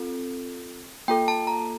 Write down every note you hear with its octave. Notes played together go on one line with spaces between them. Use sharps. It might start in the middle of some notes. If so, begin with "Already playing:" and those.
Already playing: C4 F4 A4
A#3 F4 A4 G5
A5
A#5